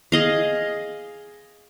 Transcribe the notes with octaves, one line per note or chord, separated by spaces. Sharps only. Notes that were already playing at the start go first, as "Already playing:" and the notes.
G#4 D#5 F5